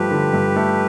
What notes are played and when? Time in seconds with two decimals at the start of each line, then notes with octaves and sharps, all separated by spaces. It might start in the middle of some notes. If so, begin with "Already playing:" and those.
Already playing: G2 F3 A3 G4 B4
0.11 D3
0.33 G2
0.56 A3